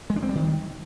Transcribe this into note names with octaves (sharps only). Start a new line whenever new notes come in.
G#3
D4
C4
G3
D#3